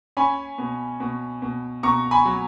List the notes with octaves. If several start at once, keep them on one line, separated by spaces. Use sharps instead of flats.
C#4 G#5 B5
B2
B2
B2
B2 A#5 C#6
G#5 B5
F#3